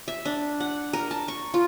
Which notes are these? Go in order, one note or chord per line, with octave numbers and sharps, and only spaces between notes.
E5
D4
F#5
A#4
A5
C#6
F4